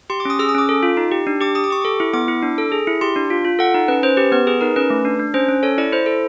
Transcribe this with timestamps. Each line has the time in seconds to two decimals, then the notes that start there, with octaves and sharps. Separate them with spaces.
0.10 G4 C6
0.20 D6
0.25 C#4 D#6
0.39 G#4 E6
0.49 D#6
0.54 C#4 D6
0.69 A4
0.83 F4
0.97 D#4
1.11 G4
1.27 D4
1.41 G4 D6
1.55 G4 D#6
1.64 D6
1.70 G4 C#6
1.82 A4 D6
2.00 E4
2.13 B3 D6
2.28 E4
2.42 D4
2.58 A4
2.72 G#4
2.87 E4
3.01 G4 C6
3.16 D4
3.30 F4
3.45 F4
3.59 A4 F#5
3.75 D#4
3.88 C#4 B4
4.03 C#4 C5
4.17 G4 B4
4.32 B3 B4
4.47 G#4 B4
4.61 D#4 A#4
4.76 C#4 B4
4.90 A3
5.05 D4
5.20 D4
5.34 C#4 C5
5.48 C#4
5.63 A4 C#5
5.78 E4 D5
5.92 E4 C5
6.06 A4